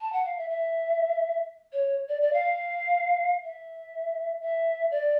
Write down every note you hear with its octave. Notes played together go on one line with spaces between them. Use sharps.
A5
F#5
F5
E5
E5
C#5
D5
D5
F5
E5
E5
D5